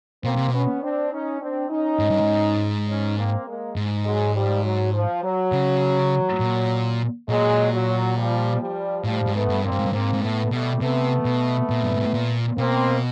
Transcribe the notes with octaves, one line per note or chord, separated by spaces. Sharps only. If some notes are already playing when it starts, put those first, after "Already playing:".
B2 A#3 C4
C3
B2 B3 C#4
C4 D4
C#4 D#4
C4 D4
C#4 D#4
G#2
G2
G#2
C#4 D#4
A#3 C4
G#3 A#3
G#2
F#3 G#3
F3 G3
F#3
F3
F#3
C#3
A#2
A#2 F#3 G#3
F#3
F3 G3
F3 G3
A2 F3 G3
G#2
A3 B3
G2
A#3 C4
G2
G#2
G2
G#2 A#3 C4
G#2
A2 A3 B3
B2 G3 A3
C3 A3 B3
B2
A#2
G2
G#2
A2
A#2
B2 A#3 C4